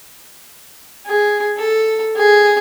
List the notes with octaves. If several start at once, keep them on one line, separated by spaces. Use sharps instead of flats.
G#4
A4
G#4